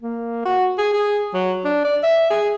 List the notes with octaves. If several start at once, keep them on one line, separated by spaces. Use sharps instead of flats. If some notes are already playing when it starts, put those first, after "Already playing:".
A#3
F#4
G#4
G#4
F#3
D4
D5
E5
G#4